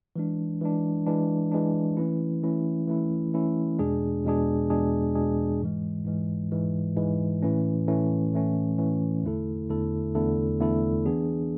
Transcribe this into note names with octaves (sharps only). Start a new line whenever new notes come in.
E3 G#3 D4
E3 G#3 D4
E3 G#3 D4
E3 G#3 D4
E3 A3 C#4 E4
E3 A3 C#4 E4
E3 A3 C#4 E4
E3 A3 C#4 E4
E2 B2 G#3 D4 G#4
E2 B2 G#3 D4 G#4
E2 B2 G#3 D4 G#4
E2 B2 G#3 D4 G#4
G#2 E3 G#3
G#2 E3 G#3
G#2 E3 G#3
G#2 E3 G#3
A2 E3 A3 C#4
A2 E3 A3 C#4
A2 E3 A3 C#4
A2 E3 A3 C#4
E2 D3 A3 E4 A4
E2 D3 A3 E4 A4
E2 D3 A3 E4 A4
E2 D3 A3 E4 A4
E3 B3 D4 G#4